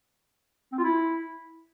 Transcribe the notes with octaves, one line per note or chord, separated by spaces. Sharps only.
C4
F4
E4